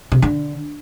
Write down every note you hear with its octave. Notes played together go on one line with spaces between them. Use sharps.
C3
D3